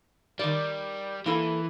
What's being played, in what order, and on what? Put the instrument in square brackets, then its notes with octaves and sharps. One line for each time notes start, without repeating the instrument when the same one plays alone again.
[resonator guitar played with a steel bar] D#3 D5 [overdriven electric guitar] G3
[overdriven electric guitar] E3 [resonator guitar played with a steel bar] A#3 E4 A4